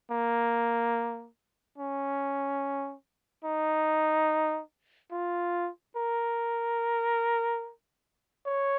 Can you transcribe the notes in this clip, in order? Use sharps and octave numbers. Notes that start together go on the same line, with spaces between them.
A#3
C#4
D#4
F4
A#4
C#5